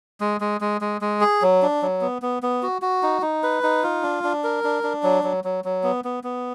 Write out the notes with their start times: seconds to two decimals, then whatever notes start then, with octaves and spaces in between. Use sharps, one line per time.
0.21 G#3
0.41 G#3
0.61 G#3
0.81 G#3
1.01 G#3
1.21 G#4
1.42 F#3
1.62 D4
1.82 F#3
2.01 B3
2.22 B3
2.43 B3
2.63 F#4
2.82 F#4
3.03 D#4
3.22 D#4
3.43 B4
3.63 D#4
3.83 F4
4.03 D4
4.24 D4
4.44 A#4
4.64 D4
4.83 D4
5.03 F#3
5.24 F#3
5.44 F#3
5.64 F#3
5.84 B3
6.05 B3
6.24 B3